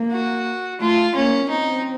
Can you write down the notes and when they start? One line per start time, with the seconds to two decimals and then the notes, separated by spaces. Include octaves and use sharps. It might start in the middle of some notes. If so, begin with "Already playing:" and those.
Already playing: A#3
0.12 F#4
0.80 A3 F4
1.15 A#3 C#4
1.50 C4 D#4